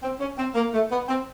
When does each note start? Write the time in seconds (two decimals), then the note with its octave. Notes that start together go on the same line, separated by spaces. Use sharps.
0.03 C4
0.20 C#4
0.38 C4
0.55 A#3
0.74 A3
0.91 B3
1.08 C4